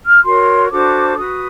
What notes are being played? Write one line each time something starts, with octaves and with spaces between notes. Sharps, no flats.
F6
F#4 A#4 C#5 C6
C#6
D4 F#4 A4 C5 D6
F#4 B4 D#6